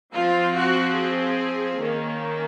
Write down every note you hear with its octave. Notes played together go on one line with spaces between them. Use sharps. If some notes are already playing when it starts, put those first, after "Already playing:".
F3 C4 F4
F#4
G#4
D#3 A#3 C#4